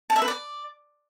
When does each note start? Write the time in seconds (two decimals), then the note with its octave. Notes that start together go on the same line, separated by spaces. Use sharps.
0.10 A5
0.16 E5
0.22 B4
0.28 D5